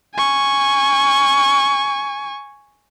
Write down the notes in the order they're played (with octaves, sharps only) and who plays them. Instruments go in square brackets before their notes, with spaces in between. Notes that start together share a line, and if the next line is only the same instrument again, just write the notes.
[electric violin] G#5 C#6